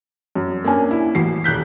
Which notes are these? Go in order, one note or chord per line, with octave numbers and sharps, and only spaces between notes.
F#2
A#3 C#4 D4 G#5
E4
A1 F#4 C7
D#1 F#6 G6 B6